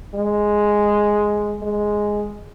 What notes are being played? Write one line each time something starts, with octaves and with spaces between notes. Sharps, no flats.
G#3
G#3